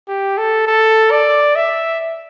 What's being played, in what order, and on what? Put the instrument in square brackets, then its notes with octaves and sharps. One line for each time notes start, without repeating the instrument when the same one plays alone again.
[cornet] G4
A4
A4
D5
E5